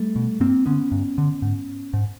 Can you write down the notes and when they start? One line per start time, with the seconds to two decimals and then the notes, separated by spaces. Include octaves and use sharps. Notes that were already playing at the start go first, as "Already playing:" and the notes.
Already playing: G3 A3
0.16 B2
0.40 G2 A#3 C4
0.66 D3 B3 C#4
0.92 G2
1.18 D3
1.42 G#2
1.93 G#2